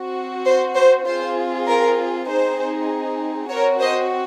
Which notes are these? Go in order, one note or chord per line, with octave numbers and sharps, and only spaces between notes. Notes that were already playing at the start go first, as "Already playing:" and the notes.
Already playing: C4 F#4
C5
C5
C4 F4 G#4 C5
A#4
C4 D#4 G#4 C5
C4 F#4 A#4 C#5
C5 D#5